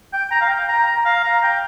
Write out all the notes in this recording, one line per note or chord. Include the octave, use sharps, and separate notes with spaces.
G5
A#5
F5
G5
A#5
A#5
F5
A#5
G5